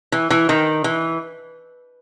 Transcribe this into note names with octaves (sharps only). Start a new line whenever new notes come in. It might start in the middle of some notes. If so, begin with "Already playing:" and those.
E3
E3
D#3
E3